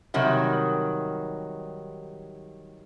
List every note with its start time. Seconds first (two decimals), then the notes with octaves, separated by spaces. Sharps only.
0.14 C3 D#3 F#3 G3